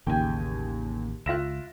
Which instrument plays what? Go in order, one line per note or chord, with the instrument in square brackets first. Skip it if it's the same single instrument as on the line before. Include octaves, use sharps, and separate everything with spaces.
[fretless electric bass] A1 C#3 [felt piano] D#2 [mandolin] G5 G#5
[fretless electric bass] C#2 [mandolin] E4 F#6 [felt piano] F4 A#6 E7